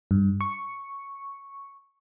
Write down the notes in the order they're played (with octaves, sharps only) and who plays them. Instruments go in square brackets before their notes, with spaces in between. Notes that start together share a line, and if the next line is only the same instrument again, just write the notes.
[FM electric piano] G2
C#6